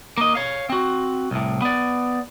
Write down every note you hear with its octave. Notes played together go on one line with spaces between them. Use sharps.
A#3 D#5
C#5 F5
C4 F#4
C2 A2
B3 D5